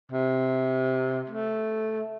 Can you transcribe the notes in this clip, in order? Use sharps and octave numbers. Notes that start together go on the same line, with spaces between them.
C3
A3